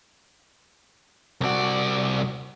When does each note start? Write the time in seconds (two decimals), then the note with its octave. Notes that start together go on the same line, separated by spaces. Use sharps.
1.41 C2 C4 F#4 D5